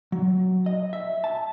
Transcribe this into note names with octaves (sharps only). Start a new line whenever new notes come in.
F#3
D#5
E5
A5